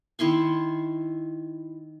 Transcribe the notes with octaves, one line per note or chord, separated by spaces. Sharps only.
D#3 E4 C6 C#6